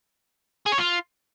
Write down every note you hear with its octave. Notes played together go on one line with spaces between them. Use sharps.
G#4
C#5
F4